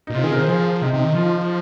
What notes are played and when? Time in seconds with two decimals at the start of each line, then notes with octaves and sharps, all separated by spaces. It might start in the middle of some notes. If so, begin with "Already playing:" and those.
0.07 A#2 D#4
0.14 C3 F4
0.23 D#3 G#4
0.31 C3 A#4
0.39 D#3 C5
0.48 F3 G#4
0.82 C3 D#4
0.94 C3
0.99 D#4
1.04 D#3
1.15 F3 F4